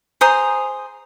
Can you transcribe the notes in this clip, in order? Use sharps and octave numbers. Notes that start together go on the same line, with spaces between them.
G#4 C5 A#5 D#6